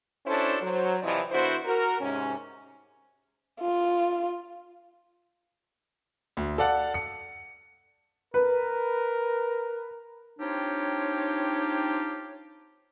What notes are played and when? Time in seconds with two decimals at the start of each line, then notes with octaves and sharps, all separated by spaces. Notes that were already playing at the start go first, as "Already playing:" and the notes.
0.26 C#4 D4 E4 F#4 A4 C5
0.62 F#3 C5
1.02 C3 E3 F3 E4 D5 D#5
1.31 D3 B3 E4 F#4 C5
1.65 F#4 A#4
2.00 G#2 C3 C#4
3.61 F4
6.37 D2
6.58 A4 D5 F5 F#5 A5
6.94 C#7
8.34 A#4 B4
10.39 C4 D4 D#4 F4 G4 C#5